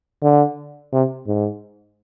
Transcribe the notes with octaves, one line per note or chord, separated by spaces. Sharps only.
D3
C3
G#2